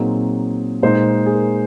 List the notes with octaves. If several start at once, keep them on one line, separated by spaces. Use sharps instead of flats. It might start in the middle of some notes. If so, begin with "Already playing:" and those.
Already playing: A#2 F#3 C4 D#4 G#4
A#2 G#3 D#4 C5
G#4
A#4